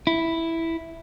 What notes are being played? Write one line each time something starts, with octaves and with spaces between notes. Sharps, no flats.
E4